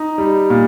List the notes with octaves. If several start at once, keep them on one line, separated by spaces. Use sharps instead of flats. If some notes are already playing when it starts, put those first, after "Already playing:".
Already playing: D#4
G3
A#2